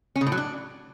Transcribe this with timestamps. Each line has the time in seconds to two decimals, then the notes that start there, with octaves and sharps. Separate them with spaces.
0.16 C#4
0.21 C#3
0.27 A2
0.32 F#3
0.37 D4